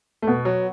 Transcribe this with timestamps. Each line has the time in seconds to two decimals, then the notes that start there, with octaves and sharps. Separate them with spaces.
0.22 A3
0.27 B2 B3
0.45 F#3